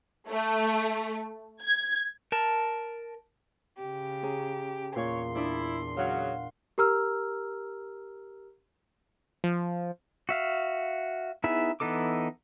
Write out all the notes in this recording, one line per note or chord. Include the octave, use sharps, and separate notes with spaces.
A3
G#6
A#4 A5
C#3 G4
C#4 G#4 A#5
E2 A#2 C#5 C6
D4 E4 D5 D#6
C#3 F#3 F5 F#5
G4 A#4 A#5 E6 F6
F3
F#4 E5 F5
B3 D#4 E4 G#4 E5
E3 B3 D#4 A4 D6